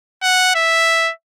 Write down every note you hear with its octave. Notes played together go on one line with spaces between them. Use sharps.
F#5
E5